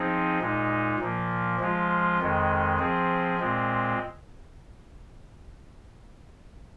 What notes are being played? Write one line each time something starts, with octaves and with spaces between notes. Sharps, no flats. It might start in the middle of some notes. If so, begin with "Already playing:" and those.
Already playing: F3 C4 D#4 G#4
A#2 G#3 D#4
A#2 F3 A#3
F3 G#3 F4
F2 D#3 G#3
F3 C4 G#4
A#2 G#3 C4